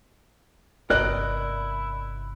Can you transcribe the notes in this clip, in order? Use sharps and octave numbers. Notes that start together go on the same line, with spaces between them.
G1 C3 E4 A#4 D5 D#5 F#6